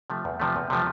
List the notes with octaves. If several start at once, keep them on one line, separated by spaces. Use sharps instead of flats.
C3 F3 A3
E2
C3 F3 A3
E2
C3 F3 A3